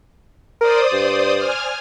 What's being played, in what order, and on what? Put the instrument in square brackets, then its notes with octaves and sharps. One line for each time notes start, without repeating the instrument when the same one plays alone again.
[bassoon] A#4 [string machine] C5 D5 D#6
[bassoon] G2
[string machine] G#5 F6